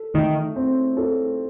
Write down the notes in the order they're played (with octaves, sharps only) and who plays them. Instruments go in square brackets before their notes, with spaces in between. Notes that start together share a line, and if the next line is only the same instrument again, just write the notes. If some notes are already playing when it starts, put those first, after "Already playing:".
Already playing: [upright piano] A4
[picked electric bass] D#3 [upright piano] A3
[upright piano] C4
A4